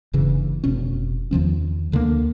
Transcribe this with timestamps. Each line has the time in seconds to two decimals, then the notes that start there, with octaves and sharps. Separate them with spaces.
0.13 F#1 G2 C#3 E3
0.64 F1 B2 D3 C#4
1.31 E2 D#3 F3 C#4
1.92 D2 D3 D#3 A#3